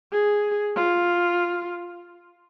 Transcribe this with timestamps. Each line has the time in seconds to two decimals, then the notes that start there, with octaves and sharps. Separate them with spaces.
0.12 G#4
0.76 F4